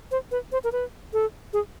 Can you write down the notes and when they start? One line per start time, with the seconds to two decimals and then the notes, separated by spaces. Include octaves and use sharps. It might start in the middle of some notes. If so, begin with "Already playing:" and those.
0.11 C5
0.32 B4
0.52 C5
0.64 A#4
0.72 B4
1.13 A4
1.53 G#4